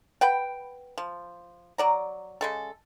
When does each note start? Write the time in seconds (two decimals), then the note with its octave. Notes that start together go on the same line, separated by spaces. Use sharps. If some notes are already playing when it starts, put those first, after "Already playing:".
0.21 B4 F#5 G5
0.98 F3
1.78 F#3 D5 A#5
2.41 C#3 G#3 A4